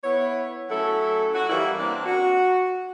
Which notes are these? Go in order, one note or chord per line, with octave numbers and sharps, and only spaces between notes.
B3 E4 C#5
F#3 A3 C#4 E4 A4 F#5
F#4
E3 G3 A#3 C#4 E4
A#3 C4 D4
F#4